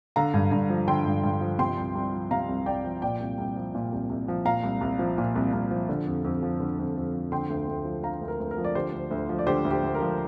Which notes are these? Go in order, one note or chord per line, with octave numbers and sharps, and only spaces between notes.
D3 F5 A#5
G2
G2
F3
D3 G5 C6
G2
G2
F3
C3 G5 C6
C2
C2
F3
C3 F5 A#5
C2
C2 D5 G5
F3
A#2 D5 G5
C2
C2
F3
A#2
C2
C2
F3
A#2 F5 A#5
C2
C2
F3
A#2
C2
C2
F3
D3
F2
F2
F3
D3
F2
F2
F3
D3 G5 C6
D2
D2
F3
D3 F5 A#5
D2
A#4
D2
A#4
F3
D5
D3 G4 C5
D2
D2
F3
D5
D3 G4 C5
D2
G4
D2
A#4
F3